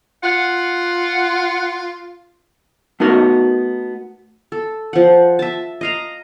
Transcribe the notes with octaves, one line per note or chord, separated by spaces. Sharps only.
F4 F#5
A3 B3 D#4 F#4 A#4
A4
F3 F#5
E5 A5
D#5 F5 A#5